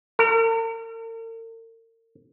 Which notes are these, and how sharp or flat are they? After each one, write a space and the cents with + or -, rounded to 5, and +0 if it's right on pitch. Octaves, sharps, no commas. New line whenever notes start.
A#4 -45